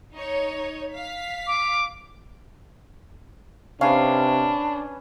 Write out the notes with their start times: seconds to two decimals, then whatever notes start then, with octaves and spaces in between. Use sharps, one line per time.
0.14 D#4 C#5
0.93 F5 B6
1.47 D6
3.81 C3 C#4 D4 B4 F5